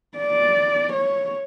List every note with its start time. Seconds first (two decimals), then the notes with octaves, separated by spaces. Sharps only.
0.18 D5
0.93 C#5